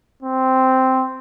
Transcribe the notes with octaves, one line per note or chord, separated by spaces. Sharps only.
C4